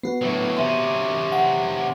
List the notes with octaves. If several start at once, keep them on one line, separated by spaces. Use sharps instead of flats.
B3 F#4 C7
A2 F#3 B4 E5
C3 C#4 E5 C6
F#5